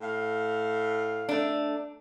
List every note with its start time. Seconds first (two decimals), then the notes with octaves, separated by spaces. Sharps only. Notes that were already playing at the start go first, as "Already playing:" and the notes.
0.01 A2 F5
1.29 A3 D4